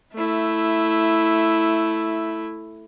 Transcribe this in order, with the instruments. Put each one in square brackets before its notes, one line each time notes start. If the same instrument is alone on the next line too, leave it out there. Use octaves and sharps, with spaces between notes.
[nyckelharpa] A3 E4